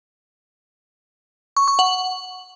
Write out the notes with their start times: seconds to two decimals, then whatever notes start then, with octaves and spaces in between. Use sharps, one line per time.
1.57 C#6
1.68 C#6
1.79 F#5